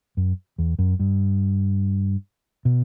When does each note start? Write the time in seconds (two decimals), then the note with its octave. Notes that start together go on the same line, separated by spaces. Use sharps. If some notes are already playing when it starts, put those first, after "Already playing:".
0.17 F#2
0.58 E2
0.79 F#2
0.99 G2
2.65 B2